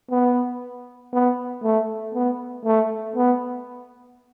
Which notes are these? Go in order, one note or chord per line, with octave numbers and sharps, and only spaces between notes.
B3
B3
A3
B3
A3
B3